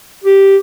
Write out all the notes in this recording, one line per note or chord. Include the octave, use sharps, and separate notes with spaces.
G4